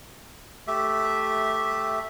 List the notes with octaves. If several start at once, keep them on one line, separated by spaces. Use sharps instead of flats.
A3 G4 E5